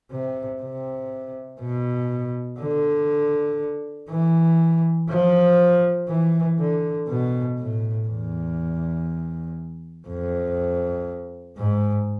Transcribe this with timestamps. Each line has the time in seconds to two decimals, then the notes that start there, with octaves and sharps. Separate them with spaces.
0.11 C3
0.61 C3
1.61 B2
2.60 D3
4.10 E3
5.09 F3
6.08 E3
6.59 D3
7.08 B2
7.59 A2
8.08 E2
10.07 F2
11.57 G#2